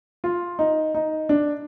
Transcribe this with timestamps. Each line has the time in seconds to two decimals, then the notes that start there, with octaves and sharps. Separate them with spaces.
0.24 F4
0.59 D#4
0.94 D#4
1.29 D4